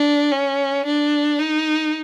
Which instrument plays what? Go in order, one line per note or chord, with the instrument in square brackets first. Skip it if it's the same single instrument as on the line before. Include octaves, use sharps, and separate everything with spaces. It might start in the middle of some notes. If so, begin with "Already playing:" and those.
Already playing: [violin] D4
C#4
D4
D#4